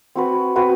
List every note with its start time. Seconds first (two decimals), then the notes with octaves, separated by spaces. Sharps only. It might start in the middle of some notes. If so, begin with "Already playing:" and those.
0.15 C4 F#4 B4
0.55 C4 F#4 B4